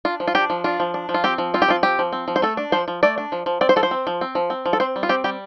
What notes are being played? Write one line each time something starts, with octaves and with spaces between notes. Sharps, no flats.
D4 F4
F3
F4
D4 G4
F3
D4 F4
F3
D4
F3
F4
C4 G4
F3
C4 F4
G4
F3 F4
C4 G4
F3
C4
F3
C5
A3 A4
D4
F3 C5
F3
A3 D5
D4
F3
F3
C4 D5
C5
F3 A4
C5
C4
F3
C4
F3
C4
F3
A4
C4 C5
G3
F4
C4 G4
G3 G4